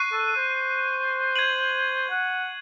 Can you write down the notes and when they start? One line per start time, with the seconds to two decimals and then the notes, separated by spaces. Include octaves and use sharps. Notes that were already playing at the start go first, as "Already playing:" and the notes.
Already playing: C#6 F#6 C7 D#7
0.12 A4
0.36 C5
1.36 G#6 D#7 F#7
2.10 F#5